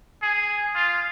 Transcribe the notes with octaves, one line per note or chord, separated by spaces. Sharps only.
G#4
F4